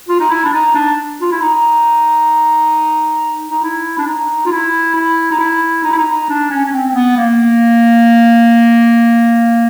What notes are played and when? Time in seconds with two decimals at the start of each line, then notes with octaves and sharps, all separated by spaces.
0.09 F4
0.20 D#4
0.30 E4
0.44 D4
0.53 D#4
0.75 D4
1.21 F4
1.32 E4
1.41 D#4
3.50 D#4
3.63 E4
3.98 D4
4.07 D#4
4.46 F4
4.52 E4
4.95 E4
5.31 D#4
5.39 E4
5.83 D#4
5.92 E4
5.98 D#4
6.29 D4
6.50 C#4
6.65 C#4
6.72 C4
6.88 C4
6.95 B3
7.17 A#3